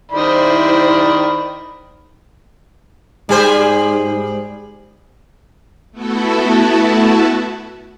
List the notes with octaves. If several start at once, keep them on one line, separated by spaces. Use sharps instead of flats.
D#3 E4 C5 D5 B5
G#2 G3 G#4 C5
A3 B3 E4 F#4 A4